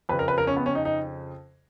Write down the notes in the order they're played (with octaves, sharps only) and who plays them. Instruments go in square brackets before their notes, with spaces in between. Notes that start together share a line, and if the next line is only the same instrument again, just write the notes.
[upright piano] F2 B4
C#3
A#4
B4
A#4
C#4
B3
C#4
D#4
D#4